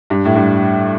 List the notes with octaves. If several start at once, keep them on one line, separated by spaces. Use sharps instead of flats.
G2
A2
G2